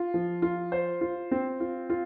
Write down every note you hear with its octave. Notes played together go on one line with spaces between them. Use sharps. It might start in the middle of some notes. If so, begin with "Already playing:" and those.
Already playing: F4
F3
F4
C5
F4
C4
F4
F4